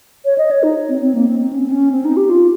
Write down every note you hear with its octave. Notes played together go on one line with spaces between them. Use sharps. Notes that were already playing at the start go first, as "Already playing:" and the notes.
C#5
D#5
C#5
D#4
C4
C4
A#3
C4
C4
C#4
C4
C#4
C4
D#4
G4
F4